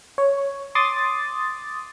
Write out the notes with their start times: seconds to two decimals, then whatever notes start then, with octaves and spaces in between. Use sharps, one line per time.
0.18 C#5
0.75 C6 D6 D#6 A6